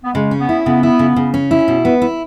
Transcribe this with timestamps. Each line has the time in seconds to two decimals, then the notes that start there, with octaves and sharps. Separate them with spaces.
0.04 B3
0.14 C#3 G#3
0.31 C#4
0.40 B3
0.49 E4
0.65 C#3 B3
0.83 E4
0.99 C#3
1.16 C#3
1.34 C#4
1.51 E4
1.68 B2
1.85 B3
2.02 E4